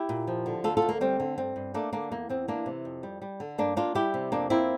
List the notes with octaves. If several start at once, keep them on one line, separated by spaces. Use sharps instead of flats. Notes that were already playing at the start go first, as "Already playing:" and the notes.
Already playing: E4 G4
A#2
F3
D3
D2 F4 A4
F4 A4
D2
A#3
G3 C4
D3
G2 C4
G2
A3 A#3 D4
D3 A#3 D4
E2 A#3
E2 C4
E3 A#3 D4
C3
F2
G3
G3
D3
G2 A#3 D4
A#3 D4 F4
G3 E4 G4
C3
F2 A#3 D4
A#3 C4 E4